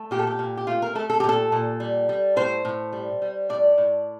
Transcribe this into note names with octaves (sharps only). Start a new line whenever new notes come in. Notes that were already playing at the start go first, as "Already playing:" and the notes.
Already playing: A3
A#2 G4
A4
G4
A#2
G4
A3 F4
A#4
A3 A4
A4
G4
A#2 A4
A#2
G3
G3
A2 C5
A2
G3
G3
A2 D5
A2